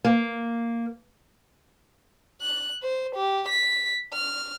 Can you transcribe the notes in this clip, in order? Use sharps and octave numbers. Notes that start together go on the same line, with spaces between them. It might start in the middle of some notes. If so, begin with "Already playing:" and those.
A#3
F#6
C5
G4
B6
F6